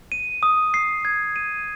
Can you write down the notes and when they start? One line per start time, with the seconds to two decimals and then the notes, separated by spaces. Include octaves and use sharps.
0.12 D#7
0.43 D#6
0.74 C7
1.05 G#6
1.36 D#7